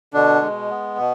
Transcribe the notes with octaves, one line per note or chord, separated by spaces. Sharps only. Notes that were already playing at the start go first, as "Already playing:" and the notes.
B2 D3 D4
G#3
B3
B2